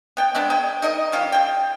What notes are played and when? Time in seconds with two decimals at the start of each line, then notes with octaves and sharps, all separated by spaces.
0.17 B3 G5
0.35 G#3 B3 D4
0.50 G#4 D#5 G5
0.82 D#4 A#4 D#5
1.12 E3 C#4 F4 G4
1.32 G#4 G5